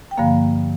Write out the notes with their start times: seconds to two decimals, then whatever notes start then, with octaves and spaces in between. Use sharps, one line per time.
0.11 G5
0.18 G2 D3 F3 A#3 F5